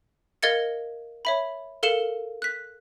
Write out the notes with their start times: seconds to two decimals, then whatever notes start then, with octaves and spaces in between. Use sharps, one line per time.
0.43 A#4 D#5 F5 G#6 A6 C#7
1.25 C#5 E5 B5
1.83 A4 A#4 F5 C#7 E7
2.42 F#6 B6